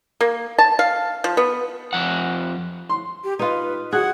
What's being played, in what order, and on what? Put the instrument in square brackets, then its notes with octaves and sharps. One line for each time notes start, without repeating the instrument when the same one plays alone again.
[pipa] A#3
A5
F5
F3
B3
[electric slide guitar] F2 F#5
[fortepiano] C6
[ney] G4
[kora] D#4 F4 [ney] B4
[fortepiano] F#4 F#6 [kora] G#4 [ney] F#5